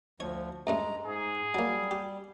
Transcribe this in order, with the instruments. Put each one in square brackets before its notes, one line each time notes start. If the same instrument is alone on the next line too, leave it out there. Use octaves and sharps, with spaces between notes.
[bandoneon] D2 F3 [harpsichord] C#5
[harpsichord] C#2 G2 A3 [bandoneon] G#3 A#5
[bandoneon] G#2 [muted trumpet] G#4
[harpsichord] F#3 A#3 [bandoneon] G3
[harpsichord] G4